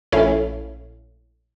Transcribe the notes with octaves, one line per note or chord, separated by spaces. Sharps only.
A#1 A3 C#4 E4 F5